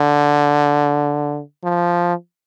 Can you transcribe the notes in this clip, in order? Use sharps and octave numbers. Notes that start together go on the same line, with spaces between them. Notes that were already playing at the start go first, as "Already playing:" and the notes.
Already playing: D3
F3